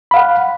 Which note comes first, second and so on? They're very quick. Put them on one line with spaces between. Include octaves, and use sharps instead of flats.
B5 F5 F#5